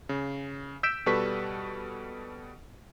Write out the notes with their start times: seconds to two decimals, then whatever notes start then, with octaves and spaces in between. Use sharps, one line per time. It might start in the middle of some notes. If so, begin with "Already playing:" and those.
0.09 C#3
0.83 E6 G6 B6 D7 E7
1.06 B2 G3 A4 B4 C#6 B6